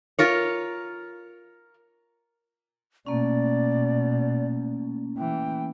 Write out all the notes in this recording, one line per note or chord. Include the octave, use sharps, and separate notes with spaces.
F4 A#4 C#5
B2 A3 A#3 C#4 D5
E3 G5